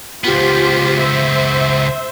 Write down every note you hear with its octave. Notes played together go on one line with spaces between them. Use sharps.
C#2 B3 F4 G4 C5
C5 E5